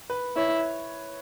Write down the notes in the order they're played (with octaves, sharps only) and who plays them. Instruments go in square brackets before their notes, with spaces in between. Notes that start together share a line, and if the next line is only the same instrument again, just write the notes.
[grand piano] B4
[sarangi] E4 [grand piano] C#5